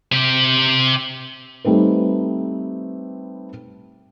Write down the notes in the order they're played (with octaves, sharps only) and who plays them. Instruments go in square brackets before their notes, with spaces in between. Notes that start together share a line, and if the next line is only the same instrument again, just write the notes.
[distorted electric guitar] C3 G4
[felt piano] G3 A3 C4 D#4 B4